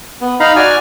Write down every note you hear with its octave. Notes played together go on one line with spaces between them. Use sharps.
B3
D#4 F5 A#5 B5
F#4 D5 G#5 F6